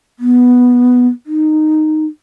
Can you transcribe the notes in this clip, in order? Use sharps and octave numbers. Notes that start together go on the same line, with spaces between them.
B3
D#4